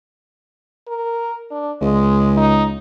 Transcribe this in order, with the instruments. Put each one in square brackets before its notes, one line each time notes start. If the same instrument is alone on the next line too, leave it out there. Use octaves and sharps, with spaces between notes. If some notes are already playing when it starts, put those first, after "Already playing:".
[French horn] A#4
D4
[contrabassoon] C#2 [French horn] G#3
[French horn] D#4